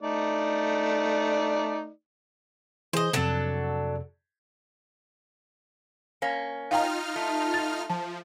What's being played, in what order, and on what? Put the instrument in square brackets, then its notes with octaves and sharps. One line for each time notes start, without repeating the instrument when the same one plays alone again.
[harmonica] A3 D#4 D5
[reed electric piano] E3 G#4 [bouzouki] C5 D#5
[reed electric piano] F2 C3 [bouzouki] F#3 D4 A4
[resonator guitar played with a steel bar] A#3 C#4
[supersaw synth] D#4 F4 F6 [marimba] F5 G5 A#5
[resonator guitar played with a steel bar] A3
[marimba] A6
[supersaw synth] F3 [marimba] A5